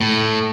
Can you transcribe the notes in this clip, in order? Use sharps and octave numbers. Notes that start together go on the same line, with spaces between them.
A2